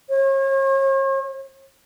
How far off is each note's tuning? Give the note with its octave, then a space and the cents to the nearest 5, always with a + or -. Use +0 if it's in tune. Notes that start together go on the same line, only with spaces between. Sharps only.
C#5 -40